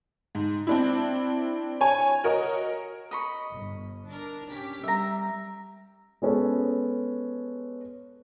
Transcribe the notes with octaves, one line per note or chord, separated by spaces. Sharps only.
G#2
C4 D4 E4
C#5 G#5
F#4 A#4 C#5 D#5
D#5 B5 C#6
G1
D4 A#4
C#4 G4 B6
G3 E5 A#5
G#3 B3 C#4 A4